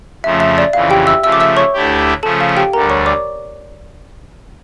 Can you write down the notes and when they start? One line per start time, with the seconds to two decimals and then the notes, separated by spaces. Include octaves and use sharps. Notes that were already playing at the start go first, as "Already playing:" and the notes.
0.24 F2 C#3 F3 A3 E5
0.40 E5
0.58 D5
0.73 F2 C#3 E3 F5
0.90 G4 G5
1.07 E5 E6
1.23 C#3 F3 A3 E5 E6
1.32 D6
1.40 E5 E6
1.57 C#5 C#6
1.73 D2 D3 A3 E4 G4
2.23 C#3 F3 A3 C#4 A4 A5
2.41 F5
2.56 G4 G5
2.73 D2 D3 G3 A#4 A#5
2.90 C#5 C#6
3.06 D5 D6